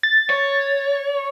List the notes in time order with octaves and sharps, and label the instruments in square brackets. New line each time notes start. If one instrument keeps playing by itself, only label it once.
[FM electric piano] A6
[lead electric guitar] C#5